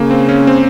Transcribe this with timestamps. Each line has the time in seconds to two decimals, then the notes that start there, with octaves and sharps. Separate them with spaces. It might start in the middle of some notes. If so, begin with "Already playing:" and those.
Already playing: C#3 A#3
0.11 C4
0.29 C#4
0.47 C4